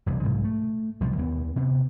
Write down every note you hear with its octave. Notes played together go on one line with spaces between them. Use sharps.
E1 C2
B1 G#2 C3 E3
A3
C2 B2 F3 G3
D#2 A#3 B3
C3 B3